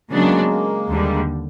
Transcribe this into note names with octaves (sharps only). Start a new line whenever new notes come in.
C#3 F#3 G#3 A#3 B3 D4
D#2 D3 G3